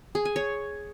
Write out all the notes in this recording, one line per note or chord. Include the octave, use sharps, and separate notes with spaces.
G#4
G#5
C#5